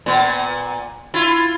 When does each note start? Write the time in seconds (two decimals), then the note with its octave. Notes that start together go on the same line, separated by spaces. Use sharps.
0.06 A#2 B3
1.14 E4 F4